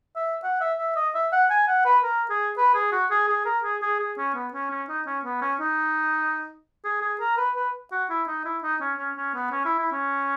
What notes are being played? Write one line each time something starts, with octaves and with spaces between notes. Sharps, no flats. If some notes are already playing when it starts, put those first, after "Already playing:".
E5
F#5
E5
E5
D#5
E5
F#5
G#5
F#5
B4
A#4
G#4
B4
G#4
F#4
G#4
G#4
A#4
G#4
G#4
G#4
C#4
B3
C#4
C#4
D#4
C#4
B3
C#4
D#4
G#4
G#4
A#4
B4
B4
F#4
E4
D#4
E4
D#4
C#4
C#4
C#4
B3
C#4
E4
E4
C#4